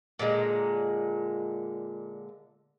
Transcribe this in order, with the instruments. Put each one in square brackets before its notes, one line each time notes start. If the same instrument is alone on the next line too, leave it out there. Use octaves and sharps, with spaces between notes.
[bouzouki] A#2 D3 G#3 A#5